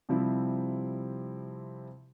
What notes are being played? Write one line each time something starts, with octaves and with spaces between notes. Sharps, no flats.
C3 F3 G3 C4 E4 C5